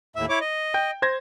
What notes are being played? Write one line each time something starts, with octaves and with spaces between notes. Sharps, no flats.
D#2 A2 E5
E4 C#5 D6
D#5
G5 G6
C5 G#6 A#6